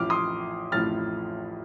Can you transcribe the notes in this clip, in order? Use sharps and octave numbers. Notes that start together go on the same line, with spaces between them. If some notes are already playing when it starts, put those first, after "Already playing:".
Already playing: A1 A2 F3 D6 F6
C6 D#6
A1 A2 F3 F6 A6